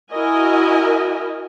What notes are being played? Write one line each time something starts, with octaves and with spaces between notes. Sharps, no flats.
E4 F#4 A#4 D#5 G#5